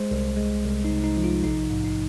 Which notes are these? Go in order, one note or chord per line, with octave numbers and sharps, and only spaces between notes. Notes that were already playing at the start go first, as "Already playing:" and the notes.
Already playing: G#3 C5
C2
G#3
C2
D#4
C3
D#4
F3
F4
A#1 D#4
G#2
D#4